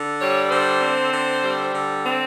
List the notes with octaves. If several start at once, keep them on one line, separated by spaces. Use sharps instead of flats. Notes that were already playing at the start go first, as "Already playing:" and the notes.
Already playing: D3
G3 C#5
D3 C5
C4
D3
G3
D3
C4